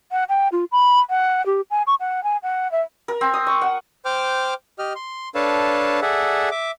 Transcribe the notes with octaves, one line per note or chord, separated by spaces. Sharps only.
F#5
G5
F4
B5
F#5
G4
G#5
C#6
F#5
G#5
F#5
E5
A#4
C4
D#6
C#6
F#5
C5 G5 D6 F6
G4 D#5 F6
C6
D4 A4 B4 C#5 F5 A5
G#4 A4 D5 E5 F#5
E5 D6